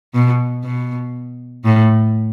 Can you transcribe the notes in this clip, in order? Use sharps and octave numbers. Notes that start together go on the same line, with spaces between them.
B2
B2
A2